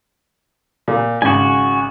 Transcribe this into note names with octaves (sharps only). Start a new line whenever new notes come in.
A#2
G#1 C#3 F#4 G#5